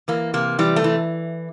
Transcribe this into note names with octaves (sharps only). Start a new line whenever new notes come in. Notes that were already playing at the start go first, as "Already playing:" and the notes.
E3 A#3
C3 A#3
E3 G3
A3
E3